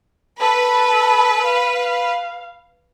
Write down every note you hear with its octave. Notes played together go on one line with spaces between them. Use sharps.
A4 B4
F5